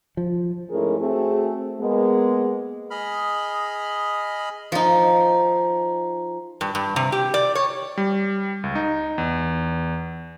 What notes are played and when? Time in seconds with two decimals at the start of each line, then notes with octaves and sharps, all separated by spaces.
0.17 F3
0.70 G#2 A3 C#4 E4 G#4 A#4
0.99 A3 C4 F#4 G#4
1.80 G#3 A#3 B3
2.91 G#4 D#5 B5 F6
4.72 F3 D#4
6.61 G2
6.75 G2
6.96 C3
7.12 G4
7.34 D5
7.55 C#5
7.98 G3
8.64 C#2
8.75 D#4
9.18 E2